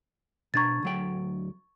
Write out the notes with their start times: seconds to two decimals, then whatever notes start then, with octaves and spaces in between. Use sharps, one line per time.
0.54 B2 D4 A#5 C#6 G#6 A6
0.83 D2 F#3 G5